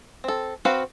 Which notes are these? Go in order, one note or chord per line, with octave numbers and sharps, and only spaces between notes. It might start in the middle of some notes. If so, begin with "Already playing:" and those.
C4 A4
C4 F#4 B4 F5